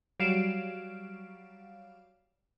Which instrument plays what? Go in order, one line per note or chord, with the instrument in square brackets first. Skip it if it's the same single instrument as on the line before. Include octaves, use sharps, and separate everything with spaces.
[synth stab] F#3 G3 F5 D7 E7